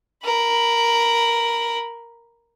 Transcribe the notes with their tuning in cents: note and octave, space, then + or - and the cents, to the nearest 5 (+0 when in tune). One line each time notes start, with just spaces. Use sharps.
A#4 +0 B5 +0